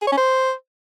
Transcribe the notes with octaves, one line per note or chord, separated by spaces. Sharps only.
G#4
C#5
C#4
C5